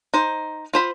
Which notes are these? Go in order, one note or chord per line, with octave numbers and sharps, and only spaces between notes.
D#4 C5
F4 C5 B5